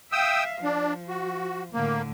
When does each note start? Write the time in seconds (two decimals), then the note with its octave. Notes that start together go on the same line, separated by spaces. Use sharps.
0.12 E5 F5 G5 D#6 E6
0.64 F3 D4
1.09 F#4
1.73 A2 D3 A#3